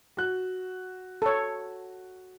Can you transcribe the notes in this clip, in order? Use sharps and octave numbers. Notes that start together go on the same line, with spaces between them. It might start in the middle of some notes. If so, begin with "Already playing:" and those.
F#4 F#6
A4 C#5